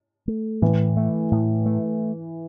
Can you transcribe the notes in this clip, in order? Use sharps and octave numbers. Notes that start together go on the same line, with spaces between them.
A3
A2 E3
A3
A2
A3